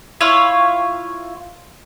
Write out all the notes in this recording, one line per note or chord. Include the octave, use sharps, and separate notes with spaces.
E4 F4 C#5 F5